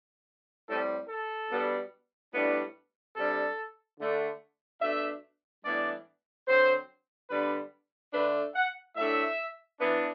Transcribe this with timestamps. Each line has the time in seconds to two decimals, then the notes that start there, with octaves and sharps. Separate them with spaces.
0.67 A2 G3 C4 A4
1.09 A4
1.50 B2 G3 B3 D4
2.33 A2 G3 B3 D4
3.16 C3 G3 D4 A4
3.99 D3 A3 D4
4.82 B2 A3 D4 E5
5.64 A2 E3 G3 B3 D4 D5
6.47 D3 F#3 C4 C5
7.30 D3 G3 B3 D4 B4
8.14 D3 A3 D4 B4
8.55 F#5
8.96 A2 F#3 A3 D4 E5
9.80 E3 B3 D4